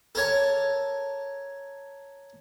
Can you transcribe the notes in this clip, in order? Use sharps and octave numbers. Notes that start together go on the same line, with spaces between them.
A4 A#4 C#5 A5